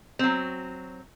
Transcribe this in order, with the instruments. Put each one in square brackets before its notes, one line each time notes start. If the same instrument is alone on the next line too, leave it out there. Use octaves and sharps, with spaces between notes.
[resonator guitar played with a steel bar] F#3 C4